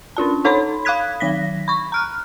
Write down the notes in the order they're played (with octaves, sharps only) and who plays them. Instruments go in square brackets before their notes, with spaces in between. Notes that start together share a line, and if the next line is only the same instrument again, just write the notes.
[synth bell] C#4 D4 F4 A5
D#4 A4 C#5 B5 C6
F5 B5 D#6 F#6 G#6 B6
D#3 F#3 A#6 B6
B5 C#6
A#5 F6 F#6